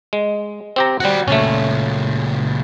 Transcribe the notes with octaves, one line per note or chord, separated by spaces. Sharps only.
G#3
C4 G4 A#5
G3 F#4 D5 F#5
C#2 A#2 A3 C#4